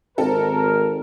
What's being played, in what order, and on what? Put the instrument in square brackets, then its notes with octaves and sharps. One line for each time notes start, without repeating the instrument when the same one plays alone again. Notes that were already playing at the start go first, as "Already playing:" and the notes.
[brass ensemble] G#1 A#4 [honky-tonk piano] C4 A4